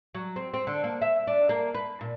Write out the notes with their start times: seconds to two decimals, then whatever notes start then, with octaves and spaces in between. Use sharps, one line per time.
0.15 F#3
0.36 C4
0.54 C4
0.67 D3
0.84 A#3
1.01 E5
1.27 D4
1.49 A#3
1.74 B4
2.01 A#2